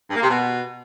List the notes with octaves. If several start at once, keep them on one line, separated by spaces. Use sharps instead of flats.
G2
A#3
C3
B2